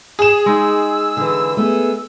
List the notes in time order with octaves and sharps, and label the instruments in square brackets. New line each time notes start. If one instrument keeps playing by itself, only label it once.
[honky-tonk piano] G#4 E7
[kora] G#3 D#4 [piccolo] E6
[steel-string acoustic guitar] D3 E3
[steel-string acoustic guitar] A3 B3 G#4 [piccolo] E6